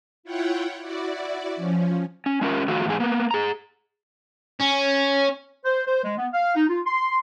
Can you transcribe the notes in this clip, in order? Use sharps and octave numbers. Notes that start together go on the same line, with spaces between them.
E4 F4 C#5 F#5 G5
E4 F#4 D5
F3 C#4
C#4
G#3 C#4 F4 A#4
D#3 F3 A3 F4 F#4
E2 G#2 G#4
A#3 B3
G#4 A#5
C#4
C5
C5
G#3
B3
F5
D#4
F4
C6